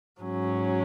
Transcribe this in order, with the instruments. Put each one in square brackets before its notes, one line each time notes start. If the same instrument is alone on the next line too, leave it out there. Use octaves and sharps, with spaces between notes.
[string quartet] G#2 F#3 C#4